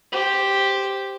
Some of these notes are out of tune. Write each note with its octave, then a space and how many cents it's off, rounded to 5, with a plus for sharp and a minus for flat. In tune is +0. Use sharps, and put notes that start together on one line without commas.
G4 +0 C5 +0